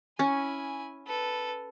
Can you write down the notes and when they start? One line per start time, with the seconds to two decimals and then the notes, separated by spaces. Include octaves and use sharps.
0.19 C#4 E4 G#5
1.07 A4 B4